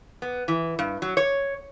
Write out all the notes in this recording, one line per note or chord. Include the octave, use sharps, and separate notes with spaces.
B3
E3
G2
F#3
C#5